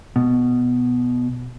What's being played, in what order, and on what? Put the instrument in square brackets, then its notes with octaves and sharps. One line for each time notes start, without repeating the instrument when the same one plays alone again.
[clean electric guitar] B2